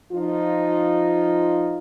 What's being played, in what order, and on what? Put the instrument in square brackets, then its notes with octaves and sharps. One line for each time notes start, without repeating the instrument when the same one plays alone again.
[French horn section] F3 D#4 F4